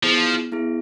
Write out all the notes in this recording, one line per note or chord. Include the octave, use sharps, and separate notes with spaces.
F3 B3 E4 G#4
B3 E4 G#4